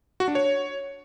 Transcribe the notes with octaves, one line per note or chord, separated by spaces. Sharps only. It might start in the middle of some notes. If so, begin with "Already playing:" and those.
F#4
D4
C#5